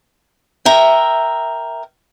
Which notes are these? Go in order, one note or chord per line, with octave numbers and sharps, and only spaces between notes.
A#4 E5 G5